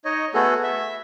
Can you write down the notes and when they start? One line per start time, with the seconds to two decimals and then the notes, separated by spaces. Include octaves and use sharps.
0.05 D#4 C#5 D#5
0.34 A3 B3 F#4 G#4 A4
0.63 E5